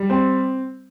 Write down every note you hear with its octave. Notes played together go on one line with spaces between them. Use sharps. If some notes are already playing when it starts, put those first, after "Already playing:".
Already playing: G3
C4